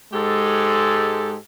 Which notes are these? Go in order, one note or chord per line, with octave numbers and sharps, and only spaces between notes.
G#2 G#3 G4 A4